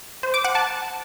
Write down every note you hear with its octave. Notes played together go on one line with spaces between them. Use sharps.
C5
D6
F#5
A5